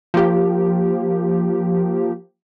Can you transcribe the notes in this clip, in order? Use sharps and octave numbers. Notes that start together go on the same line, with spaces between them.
F3 A#3 G4